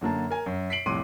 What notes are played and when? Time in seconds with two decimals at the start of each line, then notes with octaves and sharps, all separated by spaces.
0.01 F#2 D3 A#3 A5
0.31 A#4 G#5
0.46 F#2
0.70 B6 C7 D7 F#7
0.86 C2 F2 A2 C6 D6 D#7